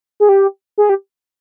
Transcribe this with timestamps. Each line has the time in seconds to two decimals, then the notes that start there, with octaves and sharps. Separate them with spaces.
0.20 G#4
0.29 G4
0.78 G#4
0.89 G4